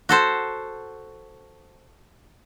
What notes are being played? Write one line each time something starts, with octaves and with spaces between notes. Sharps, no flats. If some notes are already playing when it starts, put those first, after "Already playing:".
F#4 A4 C5